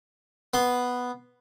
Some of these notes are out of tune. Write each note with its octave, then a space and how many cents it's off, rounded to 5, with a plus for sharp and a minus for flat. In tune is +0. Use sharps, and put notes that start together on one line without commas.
B3 +0 C6 +0